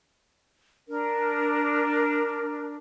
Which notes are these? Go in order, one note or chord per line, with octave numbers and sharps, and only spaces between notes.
D4 A#4